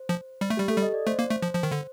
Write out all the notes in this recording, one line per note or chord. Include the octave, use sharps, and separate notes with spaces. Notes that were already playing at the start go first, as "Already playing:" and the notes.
Already playing: C5
F3
G3
A3
G3 G4
A3 A4
G3
D#5
D5
A3 C5
A#3
A3
F3
F3
D#3
D3